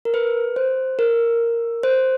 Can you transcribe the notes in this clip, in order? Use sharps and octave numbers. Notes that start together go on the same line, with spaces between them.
A#4
B4
C5
A#4
C5